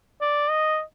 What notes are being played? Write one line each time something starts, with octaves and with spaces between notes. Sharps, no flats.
D5
D#5